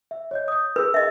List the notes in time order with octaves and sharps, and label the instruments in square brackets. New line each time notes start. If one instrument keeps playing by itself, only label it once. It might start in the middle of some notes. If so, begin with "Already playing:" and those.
[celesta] E5
C#5 D#5 G6
D#6 G6
[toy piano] G#4 B4 [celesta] A#4 E6
[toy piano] D#5 E5